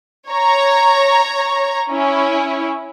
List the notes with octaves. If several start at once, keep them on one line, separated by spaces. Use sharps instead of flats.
C#5 A#5
C#4 E4